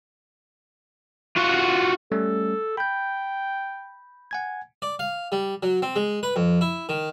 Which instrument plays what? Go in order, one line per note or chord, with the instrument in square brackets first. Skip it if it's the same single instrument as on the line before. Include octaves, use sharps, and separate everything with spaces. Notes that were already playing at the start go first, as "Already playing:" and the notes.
[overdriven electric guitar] F4 F#4
[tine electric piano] G3 A3 C#4 [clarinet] A4
[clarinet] G5 [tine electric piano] B5 G6
[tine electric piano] F#5 G#5 G#6
[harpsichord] D5
F5
G3
F#3
C4
G#3
B4
F2
E4
D#3